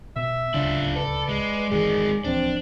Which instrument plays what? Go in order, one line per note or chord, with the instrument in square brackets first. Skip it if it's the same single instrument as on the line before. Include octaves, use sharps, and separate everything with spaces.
[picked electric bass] B2 B3 [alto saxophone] E5
[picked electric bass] D1 C#2 C#3 [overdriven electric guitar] D4 F4
[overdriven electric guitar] A4 [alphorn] B4 [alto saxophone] D5
[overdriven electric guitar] G#3
[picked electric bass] F1 E3 [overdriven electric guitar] D#3 G#3 [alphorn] G#4
[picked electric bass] D1 E3 F3 [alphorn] C4 [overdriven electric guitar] D4